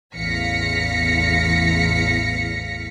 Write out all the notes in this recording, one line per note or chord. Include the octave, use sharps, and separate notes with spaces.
A1 E2 F5 A#6 B6 C#7